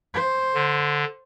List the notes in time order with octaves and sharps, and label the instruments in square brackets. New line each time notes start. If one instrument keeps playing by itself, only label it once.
[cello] C5
[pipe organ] D3